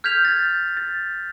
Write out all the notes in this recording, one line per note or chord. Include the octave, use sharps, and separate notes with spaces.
F6 G6 G#6 B6 F7
G#6 A6
A6